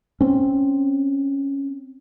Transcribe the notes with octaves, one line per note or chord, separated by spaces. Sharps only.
C4 C#4